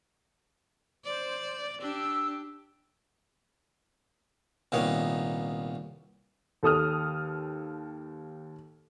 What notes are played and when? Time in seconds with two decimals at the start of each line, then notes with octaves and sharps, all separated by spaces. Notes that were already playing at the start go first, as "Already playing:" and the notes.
1.04 C5 D5
1.80 D4 G4 E6
4.72 C2 A#2 D#3 B3 C#5
6.63 D#2 A4 D#6 F6